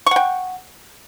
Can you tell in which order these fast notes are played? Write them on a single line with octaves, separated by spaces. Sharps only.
C#6 F#5 G5